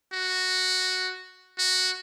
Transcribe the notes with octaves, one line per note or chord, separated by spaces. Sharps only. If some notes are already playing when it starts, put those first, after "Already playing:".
F#4
F#4